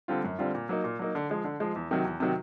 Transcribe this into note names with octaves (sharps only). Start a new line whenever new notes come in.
D3 G3 C4 F4
F#2
D3 G3 C4 F4
A#2
F#3 A#3 D#4
A#2
F#3 A#3 D#4
D3
F3 G#3
D3
F3 G#3
E2
C3 D#3 F#3
E2
C3 D#3 F#3